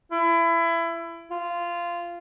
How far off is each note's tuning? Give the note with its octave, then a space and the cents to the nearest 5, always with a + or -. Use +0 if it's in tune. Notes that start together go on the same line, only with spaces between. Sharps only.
E4 +25
F4 -15